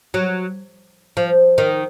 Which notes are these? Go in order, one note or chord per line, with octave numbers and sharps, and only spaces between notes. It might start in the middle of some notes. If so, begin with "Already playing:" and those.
F#3
F3
D#3